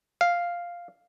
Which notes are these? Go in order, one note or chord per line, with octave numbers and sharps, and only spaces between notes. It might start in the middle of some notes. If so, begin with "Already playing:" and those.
F5